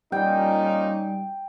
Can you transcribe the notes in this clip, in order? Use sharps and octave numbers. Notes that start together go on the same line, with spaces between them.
A#2 G3 C#4 D#4 G5